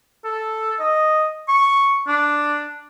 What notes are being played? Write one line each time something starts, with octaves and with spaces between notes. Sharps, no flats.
A4
D#5
C#6
D4